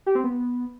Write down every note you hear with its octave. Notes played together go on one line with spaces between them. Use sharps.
G4
C4
B3